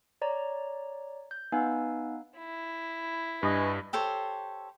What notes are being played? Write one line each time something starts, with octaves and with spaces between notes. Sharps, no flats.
C#5 D5 A#5
G6
B3 D#4 B4 F5 G#5 E6
E4
G2 B4 D#5 G#5
G4 A4 C5 C#5